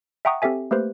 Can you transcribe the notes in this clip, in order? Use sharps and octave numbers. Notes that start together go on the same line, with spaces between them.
E5 F#5 G5 A#5 C#6 D#6
C4 G4 A4 E5 G#5
A3 A#3 G4 B4 C5